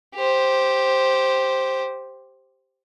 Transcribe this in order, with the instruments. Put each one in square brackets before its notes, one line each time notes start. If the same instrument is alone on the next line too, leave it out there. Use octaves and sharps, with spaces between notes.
[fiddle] G4 C5